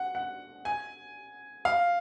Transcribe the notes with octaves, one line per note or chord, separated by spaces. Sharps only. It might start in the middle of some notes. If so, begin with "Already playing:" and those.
Already playing: F#5
F#5
G#5
F5